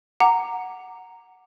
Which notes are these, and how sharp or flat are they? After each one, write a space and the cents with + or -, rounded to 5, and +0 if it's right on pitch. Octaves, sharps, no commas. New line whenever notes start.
F#5 +0 A#5 -5 D6 +0